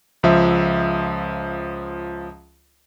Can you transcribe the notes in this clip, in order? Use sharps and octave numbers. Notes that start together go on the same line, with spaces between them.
C#2 F3 E5